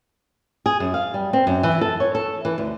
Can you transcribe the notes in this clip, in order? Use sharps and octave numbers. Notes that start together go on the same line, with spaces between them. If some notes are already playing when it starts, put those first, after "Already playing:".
G#4
F#2
F5
G3
C4
F#2
E3
A4
C#5
A4
E3
D2